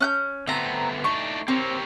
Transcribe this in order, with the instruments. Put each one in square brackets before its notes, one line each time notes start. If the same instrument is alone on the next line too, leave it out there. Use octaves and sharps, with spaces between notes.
[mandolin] C#4 F#6 G6
[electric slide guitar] D3 A3 B3 [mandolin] C4 A#5
[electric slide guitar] A3 D4 D#4 [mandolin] C#6
[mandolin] C4 [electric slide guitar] G4 A#4 C#5